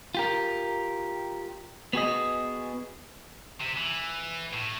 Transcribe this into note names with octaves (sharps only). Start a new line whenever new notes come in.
F4 G4 A#4
B3 F#4 G#4 D#5
C3
E3
A2